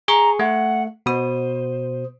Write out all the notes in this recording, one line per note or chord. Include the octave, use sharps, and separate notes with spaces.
G#4 A#5 C#6
A3 F#5
B2 C5 D#6